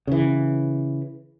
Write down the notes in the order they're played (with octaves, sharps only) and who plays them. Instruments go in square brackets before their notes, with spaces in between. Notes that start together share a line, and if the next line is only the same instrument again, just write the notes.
[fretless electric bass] C#3 E3